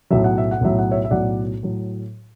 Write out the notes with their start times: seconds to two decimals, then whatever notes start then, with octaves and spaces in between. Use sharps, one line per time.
0.10 B1 A2 F#3 E5
0.24 F#5
0.38 E5
0.51 F#5
0.61 B1 A2 F#3 E5
0.79 F#5
0.92 C#5 E5
1.05 E5
1.11 B1 A2 F#3 D5 F#5
1.63 A2 F#3